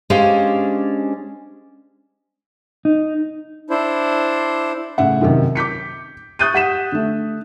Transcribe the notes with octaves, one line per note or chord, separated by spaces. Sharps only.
G#3 C#4 D4 G4 C5 F5
D#4
D4 E4 C5
A2 C#3 E5 F#5
F#2 C3 D#3
D6 G6 B6 C#7
C#6 D#6 F#6 G6 A6 D#7
G4 F#5 B6 E7
D3 A3